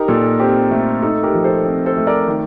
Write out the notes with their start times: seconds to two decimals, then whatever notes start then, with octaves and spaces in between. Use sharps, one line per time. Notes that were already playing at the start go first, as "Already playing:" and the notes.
Already playing: D#4 G4 A#4
0.08 A#2 A4
0.39 C4 G4
0.71 A3
1.02 D#4 A4
1.23 G4 A#4
1.34 F3
1.44 A4 C5
1.65 C4
1.86 A4 C5
1.97 A3
2.07 A#4 D5
2.28 D#3